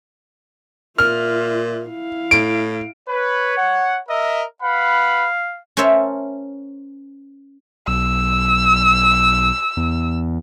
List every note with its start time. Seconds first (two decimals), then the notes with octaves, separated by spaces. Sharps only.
0.98 A#2 F4 E5 F6
1.86 E4 F5
2.31 A2 D7
3.08 B4 C#5
3.57 F#5
4.08 A#4 D#5 E5
4.62 B4 F5 F#5 B5
5.77 C#4 A#4 C5 C#5 E5 A5
7.88 B1 E6
9.77 E2